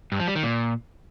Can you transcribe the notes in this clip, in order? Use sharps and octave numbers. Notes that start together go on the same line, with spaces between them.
G2
F3
G3
D#3
A#2